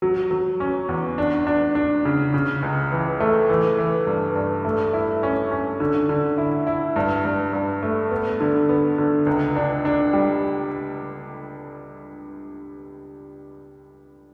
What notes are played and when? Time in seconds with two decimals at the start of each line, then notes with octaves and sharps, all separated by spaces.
0.02 F#3
0.31 F#3
0.60 C#4
0.89 E2
1.18 D4
1.47 D4
1.75 D4
2.05 C#3
2.34 C#3
2.63 C#2
2.92 E3
3.20 A3
3.49 E3
3.78 E3
4.07 G2
4.35 G2
4.65 A3
4.93 E4
5.23 C#4
5.51 C#4
5.80 D3
6.09 D3
6.38 E4
6.67 E4
6.96 G2
7.25 G2
7.53 G2
7.83 A3
8.11 B3
8.41 D3
8.69 B3
8.98 D3
9.26 C#2
9.56 D4
9.85 D4
10.13 G3